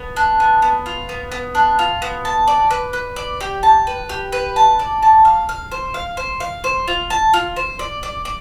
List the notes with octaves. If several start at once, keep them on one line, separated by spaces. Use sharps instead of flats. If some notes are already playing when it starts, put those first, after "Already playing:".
Already playing: B3
D4
B3
B3
F4
B3
B3
D4
F4
B3
A5
D5
B4
B4
D5
G4
A5
B4
G4
B4
A5
D5
A5
F5
F5
C5
F5
C5
F5
C5
F4
A5
F4
C5
D5
D5
D5